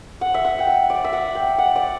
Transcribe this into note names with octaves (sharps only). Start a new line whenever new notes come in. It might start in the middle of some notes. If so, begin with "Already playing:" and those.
F#5
E5
F#5
G5
F#5
D5
E5
F#5
G5
F#5
D5